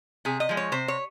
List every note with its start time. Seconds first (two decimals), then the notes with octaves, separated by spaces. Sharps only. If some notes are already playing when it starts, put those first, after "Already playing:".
0.25 C3 G#4
0.40 D#5
0.49 F3 G#3
0.57 C#5
0.72 C3 C5
0.88 C#5